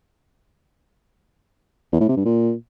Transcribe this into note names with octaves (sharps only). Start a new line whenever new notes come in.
E2
A2
C3
G2
A#2